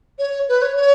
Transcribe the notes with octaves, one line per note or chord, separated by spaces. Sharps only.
C#5
B4
C#5
C#5